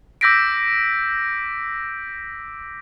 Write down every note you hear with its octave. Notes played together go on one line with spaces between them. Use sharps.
D6 E6 G6 A#6 B6 D7